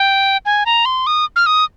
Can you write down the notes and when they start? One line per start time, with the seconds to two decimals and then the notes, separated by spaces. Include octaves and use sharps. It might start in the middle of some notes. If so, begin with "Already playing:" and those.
Already playing: G5
0.46 G#5
0.66 A#5
0.85 C6
1.07 D#6
1.36 F6
1.46 D#6